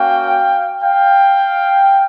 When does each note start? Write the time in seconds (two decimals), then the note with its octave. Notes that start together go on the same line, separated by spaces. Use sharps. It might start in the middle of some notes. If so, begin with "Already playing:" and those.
Already playing: A#3 C#4 F#4 F5 G5
0.83 F5 G5